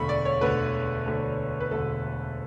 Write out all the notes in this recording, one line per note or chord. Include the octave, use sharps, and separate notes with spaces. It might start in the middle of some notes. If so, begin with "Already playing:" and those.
Already playing: E1 D2 D3 A3 B5 C#6
D5
C#5
E1 D2 D3 A3 B4
E1 D2 D3 A3
B4
E1 D2 D3 A3 A4